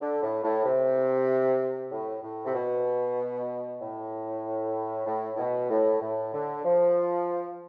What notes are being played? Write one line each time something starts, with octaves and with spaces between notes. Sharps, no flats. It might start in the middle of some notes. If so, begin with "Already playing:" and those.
D3
A2
A2
C3
A2
A2
C3
B2
A2
A2
A2
B2
A2
A2
D3
F3